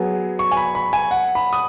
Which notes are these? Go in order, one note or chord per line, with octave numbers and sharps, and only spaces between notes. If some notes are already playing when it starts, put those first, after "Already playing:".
Already playing: F#3 B3 G#4
C#6
G#5
B5
B5
G#5
F#5
B5
D#6